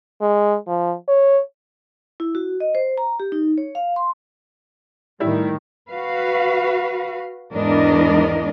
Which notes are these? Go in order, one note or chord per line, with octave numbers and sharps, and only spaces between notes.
G#3
F3
C#5
E4
F#4
D#5
C5
A#5
G4
D#4
C#5
F5
C6
A2 D#3 G3 E4
F#4 B4 F5
E2 G#2 E3 D4 A#4 D#5